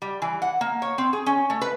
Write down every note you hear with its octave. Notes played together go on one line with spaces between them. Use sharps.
G3
E3
F#5
A#3
C#5
C4
G#4
C#4
A3
B4